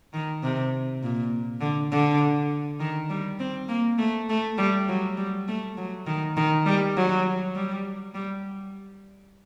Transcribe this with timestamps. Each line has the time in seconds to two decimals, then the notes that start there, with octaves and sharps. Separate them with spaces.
0.13 D#3
0.42 C3
1.02 A#2
1.61 D3
1.91 D3
2.80 D#3
3.09 G3
3.39 C4
3.69 A#3
3.98 A3
4.29 A3
4.58 G3
4.88 F#3
5.17 G3
5.48 A3
5.77 F#3
6.07 D#3
6.37 D#3
6.66 G3
6.96 F#3
7.55 G3
8.14 G3